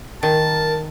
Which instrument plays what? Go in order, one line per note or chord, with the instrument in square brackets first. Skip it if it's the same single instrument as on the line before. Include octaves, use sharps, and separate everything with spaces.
[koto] D#3 [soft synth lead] A#4 [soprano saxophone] A5